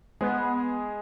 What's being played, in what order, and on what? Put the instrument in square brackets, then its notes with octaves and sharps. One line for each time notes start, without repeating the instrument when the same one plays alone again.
[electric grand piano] G#3 G#4 [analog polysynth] B3